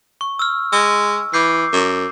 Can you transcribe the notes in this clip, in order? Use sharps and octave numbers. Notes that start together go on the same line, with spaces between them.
C#6
E6 F6
G#3 E6
E3 D6 G6 C7
F#2